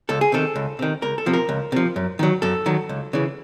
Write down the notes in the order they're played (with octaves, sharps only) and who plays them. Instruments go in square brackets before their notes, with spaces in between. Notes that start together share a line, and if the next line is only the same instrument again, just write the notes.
[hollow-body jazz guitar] C#2 A4
G#4
C3 D#3 A4
C#2
C3 D#3
C#2 A#4
A4
C3 F3
A#4
C#2
C3 F3
F#2
D#3 F#3
F#2 A4
D#3 F#3
C#2
C#3 E3